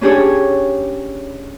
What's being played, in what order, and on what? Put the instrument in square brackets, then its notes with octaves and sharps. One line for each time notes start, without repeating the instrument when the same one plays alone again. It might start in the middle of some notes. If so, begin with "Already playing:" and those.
[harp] C#4 D4 G4 G#4 C#5